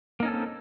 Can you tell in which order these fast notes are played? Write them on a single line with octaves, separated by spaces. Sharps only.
A#3 D#4 C#4 A4 C4